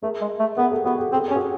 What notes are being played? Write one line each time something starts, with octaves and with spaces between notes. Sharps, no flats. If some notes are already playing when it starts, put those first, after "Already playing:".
A3 G#4 A#4
G#3
A3
B3 G#4 A#4
G4 A4
B3 F#4 G#4
G4 A4
C4 A4
G#4
C#4 G4
F#4 G#4